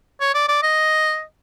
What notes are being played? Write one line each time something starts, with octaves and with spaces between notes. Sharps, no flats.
C#5
D5
D5
D#5